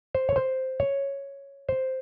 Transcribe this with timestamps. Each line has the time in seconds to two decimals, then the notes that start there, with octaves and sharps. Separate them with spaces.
0.15 C5
0.29 C#5
0.36 C5
0.80 C#5
1.69 C5